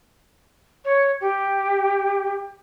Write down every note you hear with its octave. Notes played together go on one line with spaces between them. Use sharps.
C#5
G4